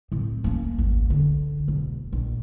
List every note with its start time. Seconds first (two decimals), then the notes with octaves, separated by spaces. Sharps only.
0.12 A2 C4
0.44 A#3 C#4
0.78 G#1 E2
1.10 D3
1.68 E1
2.12 A#1